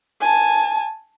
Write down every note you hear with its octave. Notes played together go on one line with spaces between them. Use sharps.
G#5 A5